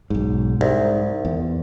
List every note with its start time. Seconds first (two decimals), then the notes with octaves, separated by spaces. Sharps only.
0.10 B1 G#2
0.61 C2 G#2
1.25 E2